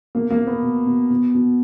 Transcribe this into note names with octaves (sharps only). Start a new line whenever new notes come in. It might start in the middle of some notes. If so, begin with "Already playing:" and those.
B2 A#3
A#3
B2
B3
B2
B2
B2
B2